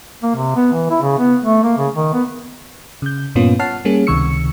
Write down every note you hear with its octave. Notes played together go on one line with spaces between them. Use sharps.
A#3
C3
B3
E3
E4
C#3
B3
A3
A#3
C#3
D#3
B3
C#3 G6
G2 A#2 A#3 B3 C#4 F4
C#5 F#5 A5 F6 C7
G3 A#3 C#4 G#4
C#2 C3 D#3 C#6 E6 C#7